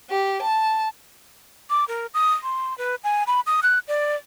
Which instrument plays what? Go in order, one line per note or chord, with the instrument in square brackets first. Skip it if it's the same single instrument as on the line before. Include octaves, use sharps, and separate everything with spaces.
[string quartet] G4
A5
[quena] D6
A#4
D#6
C6
B4
G#5
B5
D#6
F#6
D5